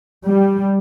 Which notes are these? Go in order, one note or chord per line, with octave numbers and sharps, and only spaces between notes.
G3